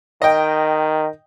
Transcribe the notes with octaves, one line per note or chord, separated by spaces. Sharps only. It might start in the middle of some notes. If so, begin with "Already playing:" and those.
D#3 D#5 G5